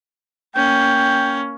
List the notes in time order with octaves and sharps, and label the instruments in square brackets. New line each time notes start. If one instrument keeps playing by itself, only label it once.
[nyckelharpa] A#3 C#4 [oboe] G5